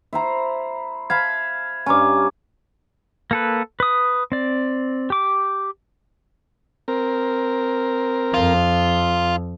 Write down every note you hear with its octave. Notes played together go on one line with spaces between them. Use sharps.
E4 C5 A#5
F5 A5 B5 G#6
G2 C#4 G#5 A#5 D6
A#3 A4 B4
B4 D#6
C4 D5
G4 D6
C4 A#4
F2 F4